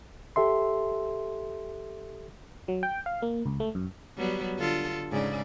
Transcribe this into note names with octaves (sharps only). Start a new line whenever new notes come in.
G4 A4 E5 C6
F#3
G5
F5
A#3
C#2
A3
F#2
F#3 G3 B3
D3 F4 A4
G#2 C#3 D5